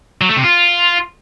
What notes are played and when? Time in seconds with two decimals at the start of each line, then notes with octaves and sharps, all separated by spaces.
0.21 F#3
0.29 A3
0.36 C3
0.44 F4